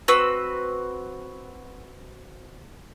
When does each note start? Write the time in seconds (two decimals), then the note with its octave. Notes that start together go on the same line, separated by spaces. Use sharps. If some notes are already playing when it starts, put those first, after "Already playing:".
0.08 C4 F#4 B4 E6